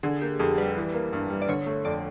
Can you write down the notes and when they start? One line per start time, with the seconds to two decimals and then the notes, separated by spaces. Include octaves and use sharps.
0.03 D3 G#4
0.21 A#3 G4
0.39 F2 G#4
0.58 G3 B4
0.76 E3
0.94 A#3
1.13 G2
1.30 G3
1.42 D5
1.48 D3 C#5
1.66 A3
1.85 F2 D5